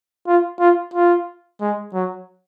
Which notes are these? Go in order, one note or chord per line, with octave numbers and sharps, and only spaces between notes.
F4
F4
F4
G#3
F#3